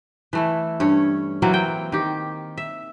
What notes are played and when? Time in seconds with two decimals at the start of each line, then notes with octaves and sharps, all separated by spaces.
0.33 E3 A3 E4
0.80 G2 C#4 C#5
1.42 E3 F#3 A#3 C4
1.54 G5
1.92 D#3 G4
2.57 E5